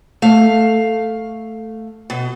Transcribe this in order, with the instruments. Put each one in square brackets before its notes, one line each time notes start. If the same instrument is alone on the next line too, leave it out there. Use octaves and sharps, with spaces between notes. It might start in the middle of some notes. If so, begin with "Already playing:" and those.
[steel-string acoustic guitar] A3 F5
B2